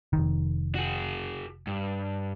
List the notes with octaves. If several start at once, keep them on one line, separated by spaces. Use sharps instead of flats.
F1 A#1 D#3
F#4 G#4
G2